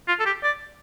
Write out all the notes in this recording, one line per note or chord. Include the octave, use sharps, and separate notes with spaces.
F4
A4
G4
D5